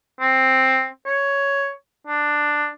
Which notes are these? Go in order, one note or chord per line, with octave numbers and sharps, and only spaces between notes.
C4
C#5
D4